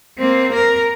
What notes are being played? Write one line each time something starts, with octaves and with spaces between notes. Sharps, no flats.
A#3 C4
A#4